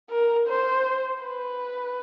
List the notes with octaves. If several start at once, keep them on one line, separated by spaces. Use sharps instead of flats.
A#4
C5
B4